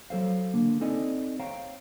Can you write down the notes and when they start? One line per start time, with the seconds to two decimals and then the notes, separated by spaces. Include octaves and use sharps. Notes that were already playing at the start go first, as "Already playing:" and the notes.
0.10 F#3 A4 C5 F5
0.54 D3 A#3
0.81 C4 D#4 A4 D5 D#5 G#5
1.39 C5 C#5 F5 G5 A#5